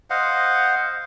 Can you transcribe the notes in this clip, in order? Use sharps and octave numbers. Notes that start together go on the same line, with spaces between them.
C5 D#5 F5 F#5